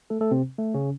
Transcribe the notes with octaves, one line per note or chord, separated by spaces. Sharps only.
A3 A4
A3 A4
C3 C4
A3
C#3 C#4